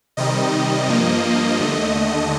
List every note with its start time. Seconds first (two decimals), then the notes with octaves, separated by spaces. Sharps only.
0.17 C3 D#3 G3 D#5
0.88 G2 F3 A#3
1.58 D#2 D3 A3